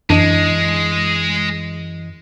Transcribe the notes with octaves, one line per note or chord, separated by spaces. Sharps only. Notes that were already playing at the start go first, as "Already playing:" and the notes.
F#2 E3 G#3 D4 D#5